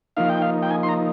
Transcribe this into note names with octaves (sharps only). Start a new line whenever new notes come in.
F3 A#3 D#4 F5
G5
F5
G5
G#5
C6
A#5